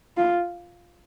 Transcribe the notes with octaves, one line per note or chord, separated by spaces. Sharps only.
F4